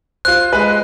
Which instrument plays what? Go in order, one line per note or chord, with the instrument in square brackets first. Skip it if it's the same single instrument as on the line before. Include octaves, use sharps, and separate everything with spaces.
[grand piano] F4 C5 [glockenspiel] F#6
[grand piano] G#3 B4